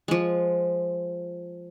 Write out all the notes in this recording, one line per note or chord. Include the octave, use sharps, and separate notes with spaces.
F3 G#3